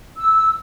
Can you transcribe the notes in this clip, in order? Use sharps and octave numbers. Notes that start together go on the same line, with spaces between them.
E6